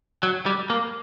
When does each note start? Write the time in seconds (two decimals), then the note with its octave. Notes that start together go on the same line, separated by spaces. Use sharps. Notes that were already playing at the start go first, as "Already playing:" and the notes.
0.23 F#3
0.46 G3
0.70 A#3